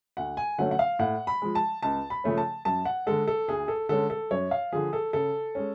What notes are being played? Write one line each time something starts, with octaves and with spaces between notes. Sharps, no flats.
D2 F#5
G#5
D3 F#3 A3 C#4 F#5
F#5
F5
A2 F#5
B5
F3 G#3
A5
C#2 A5
B5
C#3 F3 A3 C#4
A5
F#2 A5
F#5
D3 G#3 A4
A4
D2 G#4
A4
D3 G#3 C#4 A4
A4
F#2 C#5
F5
D3 F3 G#4
A4
C#3 A4
G#3 C#4